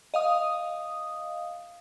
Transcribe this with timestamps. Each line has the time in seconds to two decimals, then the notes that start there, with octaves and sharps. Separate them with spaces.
0.14 D#5 F5 D#6